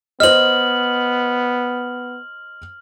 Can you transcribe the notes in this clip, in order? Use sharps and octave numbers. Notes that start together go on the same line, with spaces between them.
B3 C5 D#5 F6 F#7